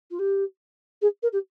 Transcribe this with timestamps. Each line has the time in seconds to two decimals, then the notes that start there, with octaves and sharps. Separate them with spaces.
0.10 F4
0.19 G4
1.01 G#4
1.22 A#4
1.32 G4